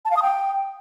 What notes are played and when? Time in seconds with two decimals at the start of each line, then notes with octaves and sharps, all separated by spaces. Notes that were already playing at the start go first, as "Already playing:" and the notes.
0.05 A5
0.11 F5
0.17 D#6
0.22 G5